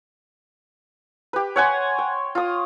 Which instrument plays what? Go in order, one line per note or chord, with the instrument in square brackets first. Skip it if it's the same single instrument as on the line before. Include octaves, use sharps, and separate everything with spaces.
[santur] G4 B4
C#5 F#5 G#5 C6
G5
F4 D#6